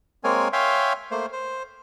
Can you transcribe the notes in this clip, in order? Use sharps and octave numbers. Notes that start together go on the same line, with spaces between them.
G#3 A#3 C4 A#4 C#5 G#5
C#5 E5 F5 G5 G#5 C6
A3 A#3 C5
C5